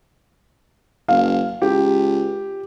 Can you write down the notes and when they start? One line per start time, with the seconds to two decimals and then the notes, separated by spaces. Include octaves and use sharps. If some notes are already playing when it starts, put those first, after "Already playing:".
1.08 F#1 F5
1.62 C#2 G4